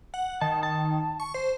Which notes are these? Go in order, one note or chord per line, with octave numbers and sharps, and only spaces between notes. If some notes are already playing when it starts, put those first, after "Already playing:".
F#5
D#3 A5
A5
C#6
C5